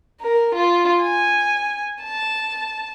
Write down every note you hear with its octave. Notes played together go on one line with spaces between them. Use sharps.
A#4
F4
G#5
A5